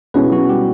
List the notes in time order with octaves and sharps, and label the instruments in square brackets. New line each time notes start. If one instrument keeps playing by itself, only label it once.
[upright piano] B2 G#3 C#4 E4 [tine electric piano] B3 B4
[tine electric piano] F#3 F#4
G3 G4